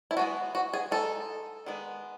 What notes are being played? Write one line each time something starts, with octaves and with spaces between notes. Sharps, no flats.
E4
E3 G#3 B3 F#4
F#4
G#4
G#3 D#4 A4
D#3 G#3 B3